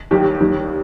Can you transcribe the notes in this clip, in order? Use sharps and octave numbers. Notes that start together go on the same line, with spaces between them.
D#2 D#3 G3 G4
D#2 D#3 G3